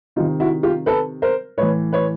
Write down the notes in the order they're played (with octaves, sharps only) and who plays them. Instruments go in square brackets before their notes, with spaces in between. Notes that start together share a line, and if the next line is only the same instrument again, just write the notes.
[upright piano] C3 D#4 F4
D#3
E4 F#4
F4 G4
A4 B4
A#4 C5
A2 E3 B4 C#5
B4 C#5